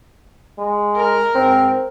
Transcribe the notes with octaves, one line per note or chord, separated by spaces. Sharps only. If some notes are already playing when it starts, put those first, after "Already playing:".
G#3
A#4
G#2 C4